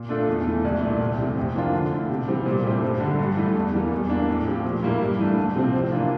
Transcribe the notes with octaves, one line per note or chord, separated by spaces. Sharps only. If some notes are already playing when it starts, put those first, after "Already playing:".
Already playing: A#2
A3 D4 F4 A4
E2
E3 A3
C2
A#2 A3
D2
C3 E3
F2
E3 A#3 D4 F4
D3
A3 E4
C3
E3 G3 C4
A#2
A3 C4 E4 G4
G2
D3 G3
G2
E3 A3 E4
E2
E3 G3 A#3
E2
E3 A#3 D4
A2
F3 C4 G4
A#2
G3 A#3 E4
G2
E3 A3 D4
D2
C3 F3 C4
A2
E3 A#3 D4 F4